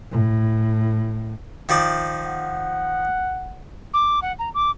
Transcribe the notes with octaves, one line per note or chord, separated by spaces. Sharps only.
A2
D#3 F3 D5
F#5
D6
F#5
A#5
D6